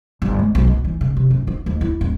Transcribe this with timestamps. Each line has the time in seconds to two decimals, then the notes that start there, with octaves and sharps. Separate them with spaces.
0.22 G1
0.39 G#3
0.55 B1
0.67 B3
0.85 E3
1.01 C#3
1.17 C3
1.30 F#2
1.47 F4
1.66 D#2
1.81 E4
2.01 D#1